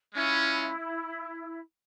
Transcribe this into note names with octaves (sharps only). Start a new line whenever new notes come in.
G#3 C#4 E4 F4